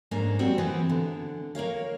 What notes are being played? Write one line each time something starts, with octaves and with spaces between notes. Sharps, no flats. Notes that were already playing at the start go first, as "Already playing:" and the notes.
G#2 A#3 C#4 D4
F#2 G3 C4 F#4
E3 B3 C4
D3
A#3 A#4 C#5 F5